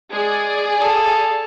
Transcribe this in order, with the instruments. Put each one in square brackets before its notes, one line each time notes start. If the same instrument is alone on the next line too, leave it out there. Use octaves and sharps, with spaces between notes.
[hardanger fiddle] G#3 [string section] G#4 D5
[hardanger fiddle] A4 F5